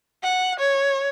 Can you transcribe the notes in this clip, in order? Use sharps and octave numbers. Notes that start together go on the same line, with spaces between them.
F#5
C#5